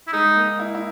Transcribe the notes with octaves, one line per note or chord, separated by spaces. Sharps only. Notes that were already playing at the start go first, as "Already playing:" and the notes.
E4
G#3 D#4
A#3
E4
E4